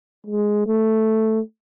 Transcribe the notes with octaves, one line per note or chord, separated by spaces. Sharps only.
G#3
A3